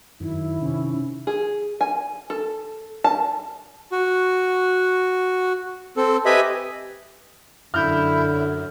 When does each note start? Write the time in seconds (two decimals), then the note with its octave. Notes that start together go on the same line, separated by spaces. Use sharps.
0.21 F#2 D#3 E4
0.62 C3 C#4
1.27 G#4
1.81 G#5
2.30 A4
3.04 A5
3.92 F#4
5.97 C4 A4
6.26 G4 B4 D#5 E5 G#5 B5
7.74 F#2 D3 E4 F6 G6
8.20 F#2